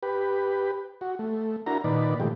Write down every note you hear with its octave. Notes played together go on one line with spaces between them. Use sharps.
G4 B4
F#4
A3
D4 E4 F#4 A#4 A#5
A#2 D#3 D#4 B4 D5
A#2 D#3 F3 G#3 A3 G4